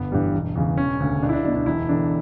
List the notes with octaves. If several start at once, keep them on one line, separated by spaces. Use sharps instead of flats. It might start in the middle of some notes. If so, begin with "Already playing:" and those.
Already playing: G1 B3
G2 E3 G3
E1
E2 C#3 E3
E1 C#4
D2 C#3
C#2 D4
E4
D4
B2 F#3 D4
D4
E1 E4
E2 D3 D4